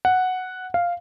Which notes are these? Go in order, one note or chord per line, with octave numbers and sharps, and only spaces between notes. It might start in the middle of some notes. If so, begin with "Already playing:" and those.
F#5
F5